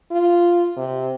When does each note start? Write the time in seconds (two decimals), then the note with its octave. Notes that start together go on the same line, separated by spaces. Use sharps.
0.11 F4
0.77 C3